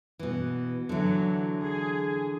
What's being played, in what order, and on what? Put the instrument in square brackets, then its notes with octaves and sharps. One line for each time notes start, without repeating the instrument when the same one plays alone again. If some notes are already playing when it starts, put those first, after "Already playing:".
[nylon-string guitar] B2 E3
[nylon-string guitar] D3 E3 [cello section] F#3
[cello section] G#4